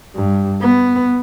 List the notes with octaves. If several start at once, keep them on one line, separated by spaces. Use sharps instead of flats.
G2
B3